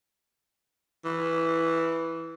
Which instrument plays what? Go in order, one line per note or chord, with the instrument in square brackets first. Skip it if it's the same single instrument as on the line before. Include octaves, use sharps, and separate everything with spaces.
[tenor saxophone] E3